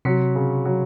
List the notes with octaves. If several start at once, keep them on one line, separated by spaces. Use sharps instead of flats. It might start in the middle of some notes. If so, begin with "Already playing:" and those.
C3 F#3
C#3
F#3